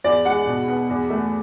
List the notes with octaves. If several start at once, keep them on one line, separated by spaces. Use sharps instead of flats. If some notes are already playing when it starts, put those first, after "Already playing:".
E2 D5
G#3 F#5
B2
B3
E2
A3